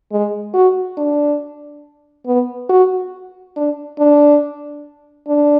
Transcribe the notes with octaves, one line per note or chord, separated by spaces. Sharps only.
G#3
F#4
D4
B3
F#4
D4
D4
D4